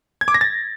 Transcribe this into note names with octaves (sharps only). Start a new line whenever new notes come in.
G#6
D6
A#6
A6